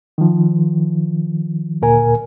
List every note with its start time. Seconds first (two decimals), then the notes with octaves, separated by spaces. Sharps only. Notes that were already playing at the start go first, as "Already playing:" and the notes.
0.18 D#3 F3
1.82 D2 A#2 A#4 G#5